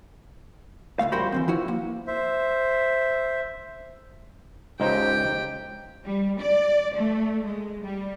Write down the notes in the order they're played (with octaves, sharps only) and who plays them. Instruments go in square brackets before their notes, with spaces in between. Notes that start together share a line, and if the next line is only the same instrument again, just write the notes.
[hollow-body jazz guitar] C#2 G2 A3 F5
F2 G3 F#4 A#4 C5 B5
E3 F#3 C4
F3 E4 F#4
A#3
[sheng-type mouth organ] C5 E5
[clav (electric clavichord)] C#2 D#4 C5 [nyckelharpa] G4 G5
[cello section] G3
D5
A3
G#3
G3